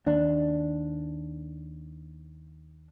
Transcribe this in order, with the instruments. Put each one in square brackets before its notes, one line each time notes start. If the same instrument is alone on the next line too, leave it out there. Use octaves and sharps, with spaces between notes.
[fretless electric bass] D#2 D4